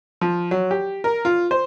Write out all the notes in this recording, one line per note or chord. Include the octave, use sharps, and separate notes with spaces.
F3
F#3
G4
A#4
F4
C5